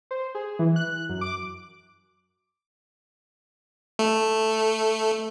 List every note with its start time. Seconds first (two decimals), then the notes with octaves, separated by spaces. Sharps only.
0.11 C5
0.35 G#4
0.59 E3
0.76 F#6
1.09 F#2
1.21 D6
3.99 A3